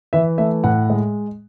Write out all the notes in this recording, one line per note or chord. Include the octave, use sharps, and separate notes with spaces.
E3 E5
A3 E5
A2 F#5
G#3